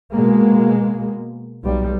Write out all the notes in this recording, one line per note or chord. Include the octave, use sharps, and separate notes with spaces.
B2 G#3 A#3
B1 G3